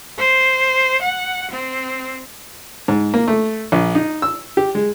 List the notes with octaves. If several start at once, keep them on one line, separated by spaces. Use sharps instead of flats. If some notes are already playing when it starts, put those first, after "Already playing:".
C5
F#5
C4
G#2
A#3
A3
A#1
D#4
E6
G4
G#3